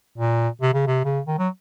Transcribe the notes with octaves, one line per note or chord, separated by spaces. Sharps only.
A#2
C3
C#3
C3
C#3
D#3
F#3